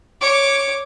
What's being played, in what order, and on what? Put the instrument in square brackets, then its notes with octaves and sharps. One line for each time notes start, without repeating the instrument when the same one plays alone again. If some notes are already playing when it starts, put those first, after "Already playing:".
[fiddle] C#5 D6